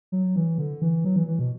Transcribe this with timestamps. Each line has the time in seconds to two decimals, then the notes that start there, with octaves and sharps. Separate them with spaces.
0.12 F#3
0.36 E3
0.58 D3
0.82 E3
1.05 F#3
1.16 E3
1.28 E3
1.39 B2